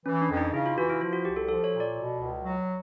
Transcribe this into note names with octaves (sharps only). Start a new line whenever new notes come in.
E3 C#4
D4
F2
D#4
C#3 E4
F4
E3 F#4
E4
F3 F4
F#4
C2 G4
A4
F3 A4
C#5
A#2
D5
B2
C#2
F#3